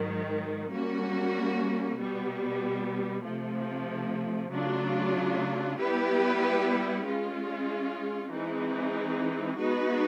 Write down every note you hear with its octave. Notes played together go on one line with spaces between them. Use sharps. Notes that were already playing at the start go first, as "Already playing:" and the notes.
Already playing: G#2 D#3 F#3
G3 A#3 C#4 F#4
B2 G3 B3
C3 F3 A3
C#3 F#3 A3 D4 F4
G3 B3 E4 G4 B4
G#3 C#4 F4
E3 G#3 C4 D#4
G#3 B3 D#4 F#4 B4